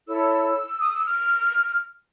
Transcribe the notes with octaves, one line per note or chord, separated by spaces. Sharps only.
E4 A4 C#5 E6
D#6
E6
F6